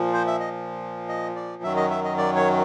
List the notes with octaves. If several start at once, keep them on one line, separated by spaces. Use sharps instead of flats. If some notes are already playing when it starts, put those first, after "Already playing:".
Already playing: A#2 F3
C5
E5
D#5
D#5
D5
F#2 D#3 F#3 E5
D#5
E5
D#5
D5
C#5